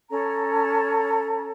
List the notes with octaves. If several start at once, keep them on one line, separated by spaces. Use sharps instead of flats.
C#4 A4 C#5 A#5